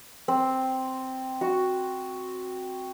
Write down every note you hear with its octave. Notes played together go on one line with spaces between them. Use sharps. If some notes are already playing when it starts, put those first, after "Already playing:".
C4
F#4